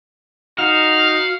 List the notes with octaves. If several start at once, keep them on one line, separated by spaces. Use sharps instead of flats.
D#4 F#4 F5 F6